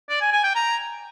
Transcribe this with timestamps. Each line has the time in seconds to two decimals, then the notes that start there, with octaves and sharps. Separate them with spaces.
0.09 D5
0.21 G#5
0.32 G#5
0.44 G5
0.55 A#5